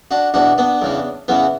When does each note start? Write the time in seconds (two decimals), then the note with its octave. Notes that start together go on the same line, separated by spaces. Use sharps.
0.11 D4 F#4
0.34 E2 B2 D4 F#4
0.58 B3 D4
0.81 E2 C#3 E3
1.28 E2 C#3 E3 B3